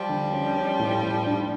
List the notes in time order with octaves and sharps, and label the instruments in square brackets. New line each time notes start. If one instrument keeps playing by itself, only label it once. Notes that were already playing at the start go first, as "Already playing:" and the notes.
Already playing: [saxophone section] F3 G3
[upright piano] D3
C#4
C#4
A2
A2
D4